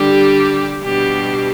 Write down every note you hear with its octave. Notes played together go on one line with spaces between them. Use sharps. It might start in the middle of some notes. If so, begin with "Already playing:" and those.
Already playing: D3 G3 D4 G4
B2 G3 D4 G4